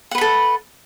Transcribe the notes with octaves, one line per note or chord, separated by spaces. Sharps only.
A4 B4 F#5 B5